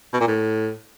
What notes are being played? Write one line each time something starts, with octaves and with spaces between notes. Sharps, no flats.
B2
A#2
A2